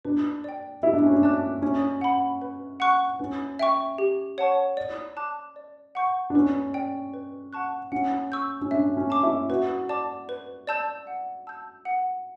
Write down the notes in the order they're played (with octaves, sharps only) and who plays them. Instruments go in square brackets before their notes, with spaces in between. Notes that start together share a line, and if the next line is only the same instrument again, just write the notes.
[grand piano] D4 [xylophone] B4
[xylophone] D5 G5
[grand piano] E4 [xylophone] G4
[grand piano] D4
C#4
D4
[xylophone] D5 A5 D6 F#6
[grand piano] C#4 [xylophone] C#5
[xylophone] F#5 B5
B4
F#5 C#6 F#6
[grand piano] C#4 [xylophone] B4
[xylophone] E5 G5 C#6
G4
C#5 F#5 A5 C#6
D5
A5 D6 F#6
D5
F#5 C#6 G6
[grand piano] D4
[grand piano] C#4 [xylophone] B4
[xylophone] D5 G5
B4
F#5 A5 C#6 F#6
[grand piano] C#4 [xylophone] F#5
[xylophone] C#6 E6 G6
[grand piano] C#4
[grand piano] D4 [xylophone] E5
[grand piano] C#4
[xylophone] A5 D6
[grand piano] E4
[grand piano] F#4 [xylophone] B4
[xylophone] D5 A5 D6
B4
D5 A5 E6 G6
F#5
A5 E6 G6
F#5